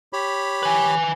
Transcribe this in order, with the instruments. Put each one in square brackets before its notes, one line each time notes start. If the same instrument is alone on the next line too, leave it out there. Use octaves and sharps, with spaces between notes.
[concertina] G4 C#5 B5
[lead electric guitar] B4 G#5